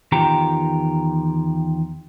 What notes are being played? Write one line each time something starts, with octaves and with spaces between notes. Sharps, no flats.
E2 D#3 F4 G4 G5 A#5